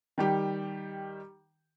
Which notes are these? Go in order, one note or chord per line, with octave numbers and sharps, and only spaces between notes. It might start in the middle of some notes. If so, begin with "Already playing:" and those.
D#3 G3 G4